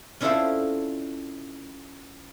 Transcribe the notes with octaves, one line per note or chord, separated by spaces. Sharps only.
C#4 D4 E4 F4 A4 C5